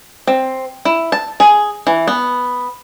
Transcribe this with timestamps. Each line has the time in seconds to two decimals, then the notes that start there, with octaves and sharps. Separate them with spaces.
0.27 C4
0.85 E4
1.12 A5
1.40 G#4
1.87 E3
2.08 B3